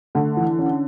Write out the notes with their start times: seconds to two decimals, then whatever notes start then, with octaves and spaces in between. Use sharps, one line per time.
0.15 D3 A3
0.37 E3
0.59 C#4